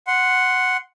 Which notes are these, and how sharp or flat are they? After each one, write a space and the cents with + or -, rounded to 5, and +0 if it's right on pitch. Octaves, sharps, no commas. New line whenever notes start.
F#5 +0 C6 +0